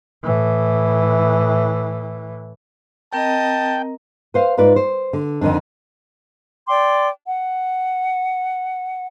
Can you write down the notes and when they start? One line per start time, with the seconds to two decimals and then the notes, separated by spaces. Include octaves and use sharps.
0.24 A2 E3
3.13 C4 A#4 D#5 G5 A5 A#5
4.34 B4 C5 F5
4.58 G#2 F4 B4 D5
4.76 C5
5.13 D3
5.41 F2 D3 D#3 C4 D4
6.67 D5 G5 C6 D6
7.25 F#5